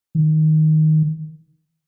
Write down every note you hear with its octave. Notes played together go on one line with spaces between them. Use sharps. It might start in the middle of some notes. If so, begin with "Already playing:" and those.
D#3